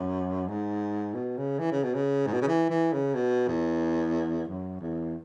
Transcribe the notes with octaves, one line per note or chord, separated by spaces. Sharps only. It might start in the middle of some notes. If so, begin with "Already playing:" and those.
Already playing: F#2
G#2
B2
C#3
E3
C#3
B2
C#3
G#2
B2
C#3
E3
E3
C#3
B2
E2
F#2
E2